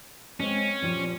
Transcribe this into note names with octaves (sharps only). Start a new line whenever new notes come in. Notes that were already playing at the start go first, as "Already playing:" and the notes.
G#3 C4 C#4
A#2 F3 G3